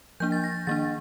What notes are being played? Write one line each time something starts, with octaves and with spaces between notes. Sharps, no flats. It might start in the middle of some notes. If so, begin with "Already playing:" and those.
F3 A#3 D4 G6
A6
A#6
D#3 A#3 D4 A6